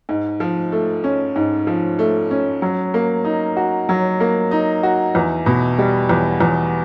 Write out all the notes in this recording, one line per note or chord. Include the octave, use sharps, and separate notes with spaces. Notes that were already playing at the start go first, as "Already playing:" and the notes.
G#2
F3
A3
C#4
G#2
F3
A3
C#4
F#3
A#3
D#4
F#4
F#3
A#3
D#4
F#4
E2
B2
G3
E2
E2